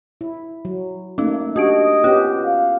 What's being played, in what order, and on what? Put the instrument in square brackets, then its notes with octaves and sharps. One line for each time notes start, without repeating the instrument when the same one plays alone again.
[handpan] E4
F#3
[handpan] A3 A#3 [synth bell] C#4 D#4
[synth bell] D4 G4 D7 [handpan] F#4 [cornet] D#5
[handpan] B3 C#4 G4 [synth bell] F4
[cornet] F5